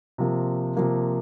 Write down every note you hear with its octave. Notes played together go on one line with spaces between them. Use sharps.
C3 F3 A#3
C3 F3 A#3